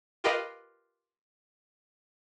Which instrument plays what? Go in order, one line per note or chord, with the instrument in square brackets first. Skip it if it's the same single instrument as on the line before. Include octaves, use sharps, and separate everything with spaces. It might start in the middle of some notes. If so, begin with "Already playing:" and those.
[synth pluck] F4 G4 A#4 B4 D#5 F5